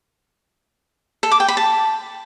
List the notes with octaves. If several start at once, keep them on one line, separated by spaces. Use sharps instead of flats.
A4
D6
G5
B5
A5